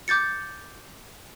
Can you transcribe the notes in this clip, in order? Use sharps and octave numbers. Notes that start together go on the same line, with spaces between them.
D6 G6 A6 C#7